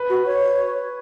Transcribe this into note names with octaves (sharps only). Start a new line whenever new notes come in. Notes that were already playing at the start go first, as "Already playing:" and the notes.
Already playing: B4
F#4
C#5